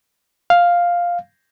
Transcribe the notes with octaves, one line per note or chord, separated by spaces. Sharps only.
F5